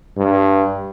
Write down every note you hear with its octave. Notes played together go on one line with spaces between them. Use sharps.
G2